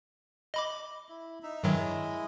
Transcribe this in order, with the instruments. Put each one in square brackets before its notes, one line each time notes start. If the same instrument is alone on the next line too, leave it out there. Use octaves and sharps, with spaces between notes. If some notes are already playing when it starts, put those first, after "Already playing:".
[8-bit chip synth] D#5 B5 D6
[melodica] E4
D#4 E5
[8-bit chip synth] G2 D#3 F#3 [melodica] G#3 E4 D#5